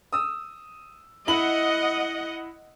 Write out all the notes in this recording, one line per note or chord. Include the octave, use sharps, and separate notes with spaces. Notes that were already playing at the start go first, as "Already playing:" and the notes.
D#6 E6
E4 D#5 F#5 B5 F#7